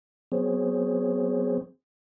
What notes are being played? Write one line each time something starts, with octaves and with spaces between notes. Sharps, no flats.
F#3 B3 C4 G#4 C5 C#5